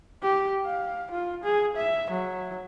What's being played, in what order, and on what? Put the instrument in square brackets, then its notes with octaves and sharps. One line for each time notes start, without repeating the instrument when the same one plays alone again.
[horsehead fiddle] G4
F5
F4
G#4
E5
F#3